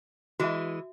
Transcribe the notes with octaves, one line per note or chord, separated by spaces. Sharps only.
E3 G#3 F#4 E5